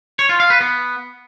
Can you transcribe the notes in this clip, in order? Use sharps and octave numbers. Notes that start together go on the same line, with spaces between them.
C#5
F4
F5
B4
B3